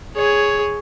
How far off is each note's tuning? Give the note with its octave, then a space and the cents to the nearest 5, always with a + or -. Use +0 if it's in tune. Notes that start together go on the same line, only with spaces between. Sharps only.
G#4 +0 C#5 +5